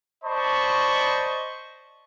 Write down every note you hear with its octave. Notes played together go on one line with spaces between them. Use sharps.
C5 D5 D#5 A5 B5 C#6